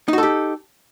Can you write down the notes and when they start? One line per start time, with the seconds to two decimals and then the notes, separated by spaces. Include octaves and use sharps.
0.08 D#4
0.13 F#4
0.18 A4
0.23 G4